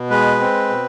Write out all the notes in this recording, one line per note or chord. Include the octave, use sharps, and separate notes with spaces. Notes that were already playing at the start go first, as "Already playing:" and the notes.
Already playing: B2
G#3 B4
C4
B2